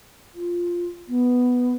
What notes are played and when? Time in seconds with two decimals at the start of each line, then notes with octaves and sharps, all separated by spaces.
0.35 F4
1.08 B3